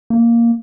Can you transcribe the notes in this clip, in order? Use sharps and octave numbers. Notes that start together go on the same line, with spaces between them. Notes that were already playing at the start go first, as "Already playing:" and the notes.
A#3